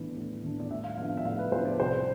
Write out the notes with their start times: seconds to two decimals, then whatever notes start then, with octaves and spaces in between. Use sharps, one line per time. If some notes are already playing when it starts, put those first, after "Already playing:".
Already playing: A2 E3 B3 D4
0.16 A2
0.43 E3 B3 D4
0.60 D5
0.70 A2 E5
0.84 F5
0.98 F3 B3 D4 F5
1.17 E5
1.24 A2 F5
1.38 B4
1.52 F3 B3 D4 C5
1.65 D5
1.79 C2 C5